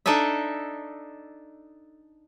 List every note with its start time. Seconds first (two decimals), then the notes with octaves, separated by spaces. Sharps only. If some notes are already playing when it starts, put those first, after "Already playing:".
0.06 D4 D#4 A4 D#5 E5